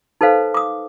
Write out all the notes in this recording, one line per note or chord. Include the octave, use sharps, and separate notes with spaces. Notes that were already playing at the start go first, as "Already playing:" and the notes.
D#4 A4 B4 C5 F5
D6 D#6